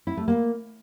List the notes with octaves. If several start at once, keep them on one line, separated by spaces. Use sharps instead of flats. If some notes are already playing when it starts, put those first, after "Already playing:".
E4
A3
A#3